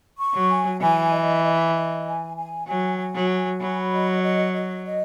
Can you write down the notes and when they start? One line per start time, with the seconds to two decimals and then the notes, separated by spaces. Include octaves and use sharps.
0.18 C#6
0.34 F#3
0.49 G#5
0.80 E3 G#5
1.12 D#5
1.43 D#5
1.74 D#5
2.05 G#5
2.37 G#5
2.68 F#3 G#5
2.98 G#5
3.15 F#3
3.30 G#5
3.61 F#3 B5
3.92 D#5
4.23 D#5
4.54 D#5
4.85 D#5